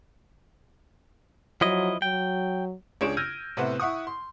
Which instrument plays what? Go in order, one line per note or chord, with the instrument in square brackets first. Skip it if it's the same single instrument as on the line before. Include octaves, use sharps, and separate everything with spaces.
[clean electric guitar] F3 E4 D#5 [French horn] F#3
[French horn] F#3 [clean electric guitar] G5
[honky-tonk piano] C#2 D4 G#4 C#5 D7 E7
E6 F6 G6 G#6 A#6 D#7
A2 C3 B3 C5 F#5
E4 F#5 C#6 D#6
C6